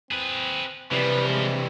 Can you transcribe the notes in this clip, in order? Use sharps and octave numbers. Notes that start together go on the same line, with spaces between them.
C4 G#4 B4
C3 E3 F3 G3 B4
G#3